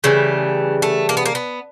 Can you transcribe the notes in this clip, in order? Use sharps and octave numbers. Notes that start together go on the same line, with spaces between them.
C#3 E3 G3 A3
A3
A#3
B3
A#3
B3